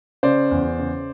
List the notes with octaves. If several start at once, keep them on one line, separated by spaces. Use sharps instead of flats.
C#3 C5 D5
E2
C#3